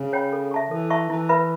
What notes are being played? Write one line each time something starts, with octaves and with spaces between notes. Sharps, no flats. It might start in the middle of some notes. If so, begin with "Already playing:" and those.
Already playing: C#3
C#5 G5 B5
A4
E5 A5 C#6
E3 A4
E5 A5 C#6
E3 E4
B4 E5 B5